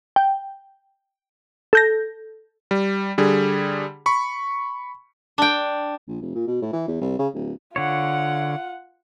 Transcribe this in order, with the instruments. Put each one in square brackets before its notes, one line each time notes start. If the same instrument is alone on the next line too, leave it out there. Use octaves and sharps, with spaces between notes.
[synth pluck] G5
A4 G6 A#6
[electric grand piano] G3
D3 G3 G#4
B5 C#6
[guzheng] D4 G5
[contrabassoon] A#1
F1
A#2
B2
A2
E3
E2
C2
C#3
D1
[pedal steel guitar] D3 C#5 [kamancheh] F4 F#5